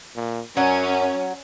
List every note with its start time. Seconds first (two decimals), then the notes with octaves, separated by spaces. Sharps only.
0.16 A#2
0.57 F#2 F#3 C#4